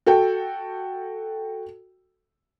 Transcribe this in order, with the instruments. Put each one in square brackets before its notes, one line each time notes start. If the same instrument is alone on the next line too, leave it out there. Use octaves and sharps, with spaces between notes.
[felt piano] F#4 A4 G5